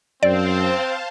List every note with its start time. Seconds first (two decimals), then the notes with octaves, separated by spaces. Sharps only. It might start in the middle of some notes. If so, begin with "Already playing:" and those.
0.23 F#2 C4 C5 D5 F5 A5